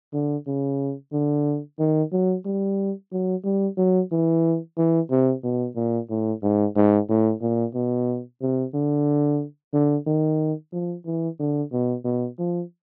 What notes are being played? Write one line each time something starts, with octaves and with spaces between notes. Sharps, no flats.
D3
C#3
D3
D#3
F#3
G3
F#3
G3
F#3
E3
E3
C3
B2
A#2
A2
G#2
G#2
A2
A#2
B2
C3
D3
D3
D#3
F3
E3
D3
B2
B2
F3